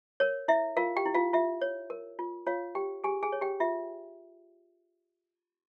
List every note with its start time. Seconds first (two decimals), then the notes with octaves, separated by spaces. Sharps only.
0.20 A#4 C#5
0.48 E4 E5
0.77 F4 A#4 F5
0.96 G4 G5
1.05 E4
1.14 F4 F5
1.33 F4 E5
1.62 C#5
1.90 A#4
2.19 F4
2.46 F4 C#5 F5
2.75 G4 G5
3.04 G4 G#4 G#5
3.23 G#4 G#5
3.32 C#5
3.41 G4 G5
3.60 F4 E5